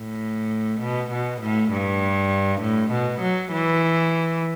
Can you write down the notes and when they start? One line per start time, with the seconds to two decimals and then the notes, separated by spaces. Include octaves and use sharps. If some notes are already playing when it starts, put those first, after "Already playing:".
Already playing: A2
0.81 B2
1.12 B2
1.42 A2
1.72 G2
2.62 A2
2.92 B2
3.22 F#3
3.53 E3